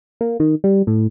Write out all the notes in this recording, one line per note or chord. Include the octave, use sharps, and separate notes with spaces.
A#3
D#3
G3
A2